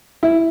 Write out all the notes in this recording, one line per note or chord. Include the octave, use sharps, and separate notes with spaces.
E4